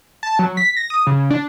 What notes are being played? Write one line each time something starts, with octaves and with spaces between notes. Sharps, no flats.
A5
F#3
B6
A#6
D#6
C#3
D4